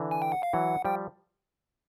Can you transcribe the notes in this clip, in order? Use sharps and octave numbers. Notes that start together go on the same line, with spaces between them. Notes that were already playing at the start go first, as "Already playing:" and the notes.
Already playing: D3 E3
G#5
G5
F#5
F5
E3 F#3 F#5
F3 G3 G5